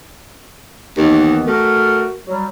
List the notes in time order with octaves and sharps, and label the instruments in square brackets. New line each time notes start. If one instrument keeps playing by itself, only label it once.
[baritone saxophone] D#2 [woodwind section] D#3 E3 B3
[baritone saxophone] A3 [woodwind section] F#4 A#4
[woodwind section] F#3 G3